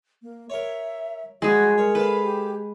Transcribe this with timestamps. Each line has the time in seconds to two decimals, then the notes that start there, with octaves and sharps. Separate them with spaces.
0.22 A#3
0.50 A#4 C#5 E5
1.42 F3 G3 G#3 F#4 G#4
1.78 A#4 C#5
1.95 A4 B4 F5
2.23 G4